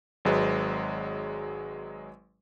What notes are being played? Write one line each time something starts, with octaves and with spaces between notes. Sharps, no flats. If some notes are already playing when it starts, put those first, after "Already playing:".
G#1 F#3 G#3 B4